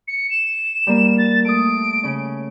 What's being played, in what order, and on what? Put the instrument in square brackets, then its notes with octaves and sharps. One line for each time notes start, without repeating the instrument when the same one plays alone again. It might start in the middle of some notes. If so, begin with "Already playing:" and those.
[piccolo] C#7
E7
[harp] G3 A#3
[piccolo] A6
[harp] A3 D#6 [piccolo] D7
[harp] C#3 C#4